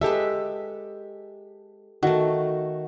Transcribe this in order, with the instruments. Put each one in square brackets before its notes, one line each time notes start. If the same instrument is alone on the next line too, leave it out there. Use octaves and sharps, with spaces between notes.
[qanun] G#3 B4 [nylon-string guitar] G4 A4 E5
[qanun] D#3 A3 [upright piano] F#4